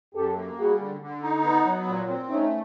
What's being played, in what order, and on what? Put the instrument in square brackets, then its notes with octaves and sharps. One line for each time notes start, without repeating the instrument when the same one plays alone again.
[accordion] F#2 [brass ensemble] G4 A4
[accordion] A#3
[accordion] G3 [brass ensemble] F#4 G#4
[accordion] D3
D3
D#4
B3
F#3
A#2
C4
[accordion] A3 [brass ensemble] C#4 D#4